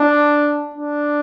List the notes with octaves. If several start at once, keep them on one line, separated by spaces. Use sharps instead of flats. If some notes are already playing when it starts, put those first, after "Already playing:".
Already playing: D4
D4